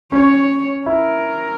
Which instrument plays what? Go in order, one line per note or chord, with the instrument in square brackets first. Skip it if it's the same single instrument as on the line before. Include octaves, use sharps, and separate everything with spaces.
[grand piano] C#4 [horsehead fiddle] C#5
[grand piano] E4 [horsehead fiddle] A#4